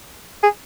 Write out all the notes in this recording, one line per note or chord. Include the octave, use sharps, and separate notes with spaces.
G#4